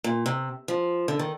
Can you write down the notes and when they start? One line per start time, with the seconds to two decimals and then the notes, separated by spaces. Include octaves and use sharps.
0.04 A#2
0.26 C3
0.68 F3
1.08 D3
1.19 D#3